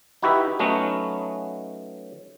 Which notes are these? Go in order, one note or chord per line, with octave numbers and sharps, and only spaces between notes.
D#4 E4 F#4 G4 B4 E5
F#3 A3 B3 C#4 D#4 F#4